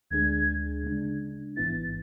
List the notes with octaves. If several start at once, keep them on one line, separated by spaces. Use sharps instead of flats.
D2 D3 G#3 D4 G#4 G#6
C#3 G#3 D4
A1 G#2 E3 B3 E4 A6